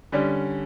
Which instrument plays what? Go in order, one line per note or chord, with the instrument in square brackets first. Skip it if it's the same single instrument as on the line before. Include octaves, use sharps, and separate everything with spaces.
[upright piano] D3 G3 C#4